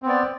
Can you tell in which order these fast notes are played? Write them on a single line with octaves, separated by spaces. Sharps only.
C4 B3 D5